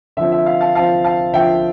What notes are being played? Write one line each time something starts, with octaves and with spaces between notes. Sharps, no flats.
D3 F3 C4 E5
E5
F5
F5 A5
D3 F3 C4 F5 A5
F5 A5
D3 F3 C4 E5 G5